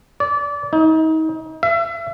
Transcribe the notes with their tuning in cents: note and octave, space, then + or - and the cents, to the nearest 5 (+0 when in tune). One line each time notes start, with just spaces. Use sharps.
D5 -25
D#4 +35
E5 +35